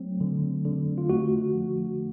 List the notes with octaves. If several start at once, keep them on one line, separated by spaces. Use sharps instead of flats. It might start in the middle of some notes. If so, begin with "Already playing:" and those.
Already playing: F#3 A3 C4
D3
D3
F4
A3 F#4
F3